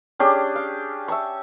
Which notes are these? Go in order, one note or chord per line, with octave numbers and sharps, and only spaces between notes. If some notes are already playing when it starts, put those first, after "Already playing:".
C#4 D4 G4 G#4
F5
E5 A5 C#6